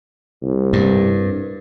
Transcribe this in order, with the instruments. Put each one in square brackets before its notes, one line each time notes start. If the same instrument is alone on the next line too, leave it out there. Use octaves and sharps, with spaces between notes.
[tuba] C2
[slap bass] G2